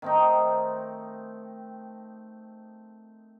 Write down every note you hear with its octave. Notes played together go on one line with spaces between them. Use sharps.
D#3 A3 C4 D#4